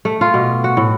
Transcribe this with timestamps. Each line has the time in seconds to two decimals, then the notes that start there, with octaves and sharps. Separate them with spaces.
0.05 A3
0.21 F4
0.34 B2
0.64 F#4
0.77 A2